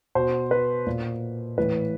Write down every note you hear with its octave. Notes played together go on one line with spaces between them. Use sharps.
B2 C5
B4
A#2
A2 E3 B4